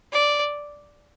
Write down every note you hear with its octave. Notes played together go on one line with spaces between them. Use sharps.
D5